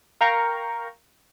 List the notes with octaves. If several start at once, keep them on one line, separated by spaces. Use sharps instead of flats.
A#4 F5 G5 A#5 C#6